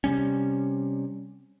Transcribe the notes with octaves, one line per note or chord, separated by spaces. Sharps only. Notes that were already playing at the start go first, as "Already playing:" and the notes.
C3 G3 C#4